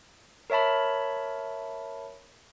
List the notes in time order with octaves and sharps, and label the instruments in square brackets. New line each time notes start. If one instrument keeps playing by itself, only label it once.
[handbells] A#4 C#5 E5 A5 B5